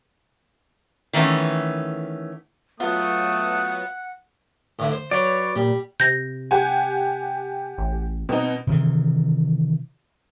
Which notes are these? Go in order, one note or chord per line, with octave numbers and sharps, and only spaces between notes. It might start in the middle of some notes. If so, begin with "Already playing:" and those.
D#3 E3 A3 B3 C#4
F#3 A3 B3 F4 F#5 D#6
A2 D3 E4
C5
F#3 B4 C#5 D5
A#2 G3
C3 G6 A#6
G4 F#5 G#5
A1
B2 C4 D#4
C3 D#3 E3